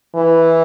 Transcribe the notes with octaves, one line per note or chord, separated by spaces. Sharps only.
E3